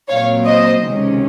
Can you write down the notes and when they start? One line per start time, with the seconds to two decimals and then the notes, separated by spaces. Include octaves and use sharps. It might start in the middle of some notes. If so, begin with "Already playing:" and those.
0.08 A#2 F#3 C4 C#5 F5
0.45 C5 D#5
0.83 C#2 C3 D#3 G#3 C#4